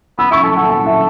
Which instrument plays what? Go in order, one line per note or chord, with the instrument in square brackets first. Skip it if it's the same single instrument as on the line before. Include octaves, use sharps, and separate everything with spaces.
[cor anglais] B3 [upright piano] E6
[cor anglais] E4 [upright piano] C#6
[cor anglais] A4 [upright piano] A5
[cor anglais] A4 [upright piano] F#5
[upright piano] A5
E5